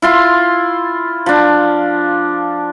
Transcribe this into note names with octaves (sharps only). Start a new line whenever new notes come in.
E4 F4 C6
F3 D4